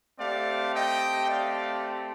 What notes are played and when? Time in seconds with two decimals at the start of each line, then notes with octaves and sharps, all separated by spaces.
0.18 A3 C4 G4 D5 F5
0.74 D#5 G5
1.30 D5 F5